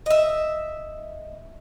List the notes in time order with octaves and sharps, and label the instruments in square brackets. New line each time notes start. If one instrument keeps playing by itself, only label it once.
[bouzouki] D#5 E5